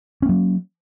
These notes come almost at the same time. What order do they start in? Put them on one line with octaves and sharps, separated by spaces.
C#4 A#3 F#3